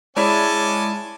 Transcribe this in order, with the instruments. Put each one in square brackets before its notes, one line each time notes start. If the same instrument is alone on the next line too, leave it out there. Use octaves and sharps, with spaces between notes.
[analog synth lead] G#3 [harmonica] C#4 G#5 D6 [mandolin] E4 C#5 D5 [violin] A5